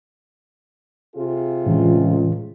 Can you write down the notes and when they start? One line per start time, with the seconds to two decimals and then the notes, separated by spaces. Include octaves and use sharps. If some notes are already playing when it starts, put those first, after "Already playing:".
1.15 C3 F4 G#4
1.66 C#2 A2 E3